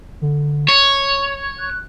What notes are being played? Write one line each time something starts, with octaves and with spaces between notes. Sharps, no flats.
D3
C#5 C#6
F#6